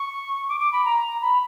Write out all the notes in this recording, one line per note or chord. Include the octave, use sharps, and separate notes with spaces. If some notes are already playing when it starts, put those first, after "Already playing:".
Already playing: C#6
D6
D6
B5
A#5
B5